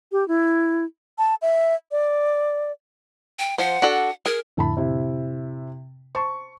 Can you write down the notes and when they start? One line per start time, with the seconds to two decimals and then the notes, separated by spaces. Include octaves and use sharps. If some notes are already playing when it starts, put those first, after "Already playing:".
0.12 G4
0.28 E4
1.18 A5
1.42 E5
1.92 D5
3.39 G5
3.58 F3 C5 F#5
3.82 D4 F#4 A4
4.26 G#4 A#4
4.57 F2 A2 D3 E4 A5 B5
4.77 C3 E4
6.15 C5 A5 C6 C#6